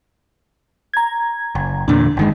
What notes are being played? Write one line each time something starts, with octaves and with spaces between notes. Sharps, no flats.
A#5 G#6
F#1
E2 A#2 D3 D4
G1 D#3 G#3